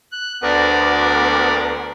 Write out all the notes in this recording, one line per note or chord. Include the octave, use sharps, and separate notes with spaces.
F#6
D2 B3 A#4 D5